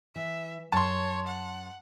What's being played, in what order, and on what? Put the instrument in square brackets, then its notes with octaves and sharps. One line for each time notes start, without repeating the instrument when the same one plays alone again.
[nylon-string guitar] E3 [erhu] E5
[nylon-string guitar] F#2 [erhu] C#5 [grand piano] A5 C6
[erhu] F#5